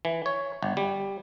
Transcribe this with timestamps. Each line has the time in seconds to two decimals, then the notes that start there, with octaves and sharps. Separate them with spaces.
0.05 E3
0.26 C#5
0.63 G1
0.77 G3